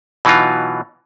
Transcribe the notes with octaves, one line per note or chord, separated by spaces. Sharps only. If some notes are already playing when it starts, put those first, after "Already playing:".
B2 E3 F#3 D#4 F4